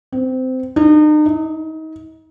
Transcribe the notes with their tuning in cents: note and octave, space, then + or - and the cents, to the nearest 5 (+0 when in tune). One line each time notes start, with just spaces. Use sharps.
C4 -20
D#4 -40
D#4 +30